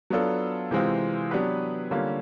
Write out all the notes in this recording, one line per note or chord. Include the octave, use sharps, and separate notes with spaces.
F#3 B3 D4 F4 A4
C3 E3 G#3 C4 F4
F#3 B3 D4 G4 B4
D3 G3 A#3 C#4 F4